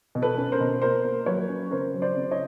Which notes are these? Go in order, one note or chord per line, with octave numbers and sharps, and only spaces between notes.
B2
A4 B4
C#4
A#4 C5
B2
A#3 A#4 C5
A#3
F#3 B4 C#5
C#4
C#3 A#4 C5
F#3
C5 D5
C#3
C#5 D#5